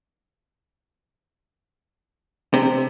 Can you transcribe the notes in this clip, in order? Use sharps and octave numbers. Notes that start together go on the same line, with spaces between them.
C3